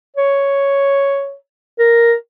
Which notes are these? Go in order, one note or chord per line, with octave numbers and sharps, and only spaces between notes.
C#5
A#4